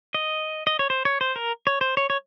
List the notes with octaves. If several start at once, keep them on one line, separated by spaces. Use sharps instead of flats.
D#5
D#5
C#5
C5
C#5
C5
A#4
C#5
C5
C#5
C#5